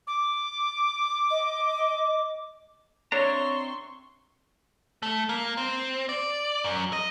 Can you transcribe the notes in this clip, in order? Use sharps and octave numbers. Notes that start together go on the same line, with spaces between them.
D6
D#5
C4 D4 C#5 E5 A#5 C6 C#6
A3
A#3
C4
D5
F#2
D#5